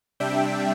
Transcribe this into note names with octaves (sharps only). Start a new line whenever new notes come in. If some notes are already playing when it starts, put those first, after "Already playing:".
C3 G3 D4 E5 G5